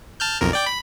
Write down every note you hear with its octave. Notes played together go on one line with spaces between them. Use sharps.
A5 F6 G6
B1 F2 A#4
D5 G5 D6
B5